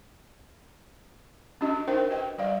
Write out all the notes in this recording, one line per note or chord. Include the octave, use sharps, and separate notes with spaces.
C#4 D4 F#4 D#5
D4 D#4 A#4 C5 E5 G5
F#4 B4 D#5 G5
G3 D5 F5